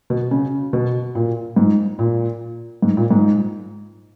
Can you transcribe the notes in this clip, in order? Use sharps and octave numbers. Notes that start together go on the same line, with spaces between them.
B2
C#3
B2
A#2
G#2
A#2
G#2
A#2
G#2